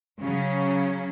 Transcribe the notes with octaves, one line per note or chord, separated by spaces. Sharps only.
C#3 F#3 C#4